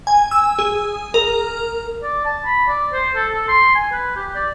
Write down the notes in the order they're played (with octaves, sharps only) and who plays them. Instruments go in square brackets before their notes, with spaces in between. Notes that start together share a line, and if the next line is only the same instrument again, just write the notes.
[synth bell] G#5
E6
G#4
A#4
[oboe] D5
A5
B5
D5
C5
A4
A4
C6
G#5
B4
G4
D5